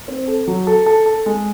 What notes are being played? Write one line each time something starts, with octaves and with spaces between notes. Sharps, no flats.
C4
A4
F#3
A4
A4
A4
G#3